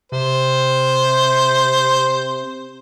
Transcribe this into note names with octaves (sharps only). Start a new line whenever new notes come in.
C3 C5